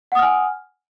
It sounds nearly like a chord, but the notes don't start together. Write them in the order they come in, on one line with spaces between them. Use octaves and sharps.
F#5 D#6 F6 G#5